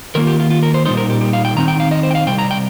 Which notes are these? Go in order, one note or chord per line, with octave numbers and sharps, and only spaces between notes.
D#3 A#3 F4 A#4
G4
F4
F4
A#4
C5
A#2 G3 D#4 C5
A#4
G4
G4
F5
G5
D#3 C4 D#4 A#5
G5
F5
D#5
C5
G5
F5
C3 G3 G5
A#5
G5